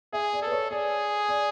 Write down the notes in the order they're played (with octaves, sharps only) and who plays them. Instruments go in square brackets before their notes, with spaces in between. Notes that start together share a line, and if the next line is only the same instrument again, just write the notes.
[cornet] G#4 [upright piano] E5
[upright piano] D5
[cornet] A4 [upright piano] B4
[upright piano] C#5
[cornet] G#4 [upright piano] D5
[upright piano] D5